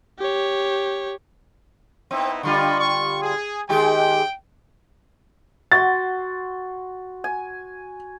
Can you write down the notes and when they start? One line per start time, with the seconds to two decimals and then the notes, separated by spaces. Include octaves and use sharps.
0.19 G4 C#5
2.11 B3 C4 D#4 E4
2.43 D3 G3 F4 D#5 C6 C#6
2.79 C#6
3.22 G#4
3.69 D#3 G#3 G4 G5
5.72 F#4 C6 A6
7.24 G#5